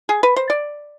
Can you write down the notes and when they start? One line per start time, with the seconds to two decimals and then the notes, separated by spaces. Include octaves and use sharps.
0.09 G#4
0.23 B4
0.36 C5
0.50 D5